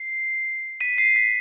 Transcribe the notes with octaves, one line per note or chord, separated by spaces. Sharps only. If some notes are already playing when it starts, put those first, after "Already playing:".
Already playing: C7
B6 D#7
C7
B6